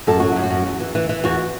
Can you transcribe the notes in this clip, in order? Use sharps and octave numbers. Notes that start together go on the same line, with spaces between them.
F#2 A4
F#3 F#4
F#2 E4
F#4
F#2
E2
E3
E3
E3
E2 F#4